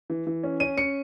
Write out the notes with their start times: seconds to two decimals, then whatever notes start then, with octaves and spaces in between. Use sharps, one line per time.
0.10 E3
0.27 E3
0.43 C#4
0.60 C#4 D#7
0.77 C#4 C#7